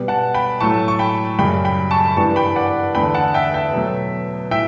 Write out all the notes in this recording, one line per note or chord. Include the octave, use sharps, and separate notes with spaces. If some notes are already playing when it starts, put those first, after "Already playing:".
Already playing: B2 G3 B3
F#5 A5
G5 B5
A2 F#3 A3 A5 C#6
C#6
G5 B5
F#2 C#3 G3 G5 B5
G5 B5
A5 C#6
B5
G2 E3 G3 B3 A5 C#6
G5 B5
D5 F#5
E2 D3 A3 G5 B5
F#5 A5
E5 G5
E5 G5
B2 F#3 A3
A2 E5 G5